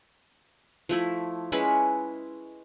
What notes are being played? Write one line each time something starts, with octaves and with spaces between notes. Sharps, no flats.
F3 A3 E4
G#3 C#4 E4 B4